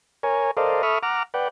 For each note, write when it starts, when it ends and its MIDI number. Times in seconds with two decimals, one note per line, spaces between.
0.23 0.51 70
0.23 0.51 73
0.23 0.51 80
0.57 0.82 69
0.57 0.82 70
0.57 0.82 72
0.57 0.82 74
0.57 0.82 75
0.57 0.82 77
0.83 0.99 69
0.83 0.99 76
0.83 0.99 83
0.83 0.99 85
0.83 0.99 87
0.83 0.99 89
1.03 1.23 78
1.03 1.23 82
1.03 1.23 86
1.03 1.23 89
1.34 1.48 71
1.34 1.48 74
1.34 1.48 78
1.34 1.48 79